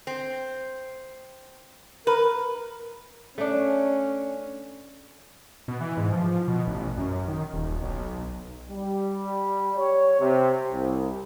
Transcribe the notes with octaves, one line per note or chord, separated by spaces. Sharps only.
C4
A#4 B4
A3 C#4 D4
B2
E3
G#2
F3
B2
A1
F#2
D#3
D#1
B1
G3
C#5
C3
C2